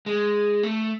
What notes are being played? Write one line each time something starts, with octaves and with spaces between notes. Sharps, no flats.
G#3
A3